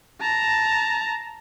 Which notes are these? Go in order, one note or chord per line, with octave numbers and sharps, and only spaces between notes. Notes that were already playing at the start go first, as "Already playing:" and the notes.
A5 A#5